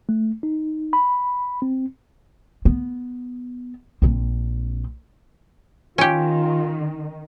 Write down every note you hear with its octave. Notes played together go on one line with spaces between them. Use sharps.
A3
D#4
B5
C4
B3
A#1 C4
D#3 C#4 F4 G4